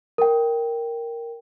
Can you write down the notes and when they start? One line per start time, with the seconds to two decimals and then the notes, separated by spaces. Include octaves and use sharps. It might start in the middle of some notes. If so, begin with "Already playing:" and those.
0.18 A#4 G5